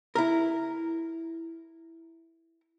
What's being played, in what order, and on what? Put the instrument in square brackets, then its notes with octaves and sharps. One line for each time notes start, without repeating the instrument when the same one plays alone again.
[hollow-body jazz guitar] E4 A#4